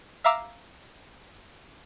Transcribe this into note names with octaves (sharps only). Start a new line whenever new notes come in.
E5 F5 A#5 D6 E6